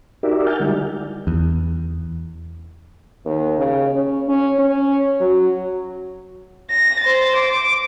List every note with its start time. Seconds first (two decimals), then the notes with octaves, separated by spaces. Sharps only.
0.23 D#4 F#4 G4 A#4 D5 E5
0.47 A#4 F#5 G#5 F6 G6 A6
0.60 D3 G3 G#3 D#4 E4 G4
1.27 E2
3.25 D#2
3.58 C#3
3.95 C#4
4.28 C#4
4.59 C#4
5.20 F#3
6.71 A#6
7.00 C5 A6
7.36 D6